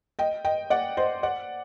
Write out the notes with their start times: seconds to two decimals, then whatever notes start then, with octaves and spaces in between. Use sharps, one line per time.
0.19 D#5 G5
0.45 D#5 G5
0.70 D5 F#5
0.97 C5 D#5
1.23 D5 F#5